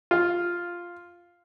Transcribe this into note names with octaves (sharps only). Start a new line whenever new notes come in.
F4